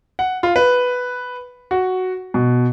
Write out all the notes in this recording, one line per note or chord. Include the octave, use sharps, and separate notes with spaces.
F#5
F4
B4
F#4
B2